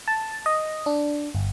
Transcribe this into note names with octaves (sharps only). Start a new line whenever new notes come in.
A5
D#5
D4
G1